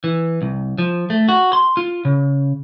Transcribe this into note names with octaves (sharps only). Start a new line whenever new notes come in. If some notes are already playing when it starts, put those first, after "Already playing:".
E3
C2
F3
A3
F#4
C6
F4
C#3